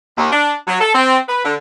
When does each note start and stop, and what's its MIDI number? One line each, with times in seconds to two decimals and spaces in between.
0.17 0.31 39
0.31 0.54 62
0.68 0.79 54
0.80 0.91 69
0.94 1.16 60
1.28 1.44 71
1.44 1.54 50